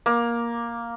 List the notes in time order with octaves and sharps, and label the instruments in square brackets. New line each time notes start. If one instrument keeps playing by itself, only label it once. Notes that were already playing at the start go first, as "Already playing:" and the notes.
[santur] A#3